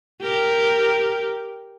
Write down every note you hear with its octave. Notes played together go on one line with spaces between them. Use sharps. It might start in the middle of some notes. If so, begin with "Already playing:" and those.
G4 A#4